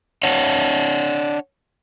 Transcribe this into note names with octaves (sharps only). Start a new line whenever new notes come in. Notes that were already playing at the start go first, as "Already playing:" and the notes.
D4 C#5 F#5